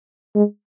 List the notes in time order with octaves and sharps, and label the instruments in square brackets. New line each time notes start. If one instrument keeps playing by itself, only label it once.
[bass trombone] G#3